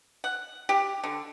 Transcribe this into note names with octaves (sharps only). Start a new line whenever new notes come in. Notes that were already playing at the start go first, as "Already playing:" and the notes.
F#5
G4
D3